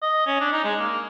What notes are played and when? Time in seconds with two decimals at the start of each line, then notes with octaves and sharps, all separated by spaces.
0.02 D#5
0.27 C#4
0.40 D4
0.52 D#4
0.64 G#3
0.79 A#3